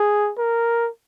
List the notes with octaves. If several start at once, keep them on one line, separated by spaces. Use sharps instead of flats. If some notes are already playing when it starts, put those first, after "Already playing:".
Already playing: G#4
A#4